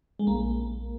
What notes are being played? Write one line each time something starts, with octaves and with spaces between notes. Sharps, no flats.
G#3
A#1 A#3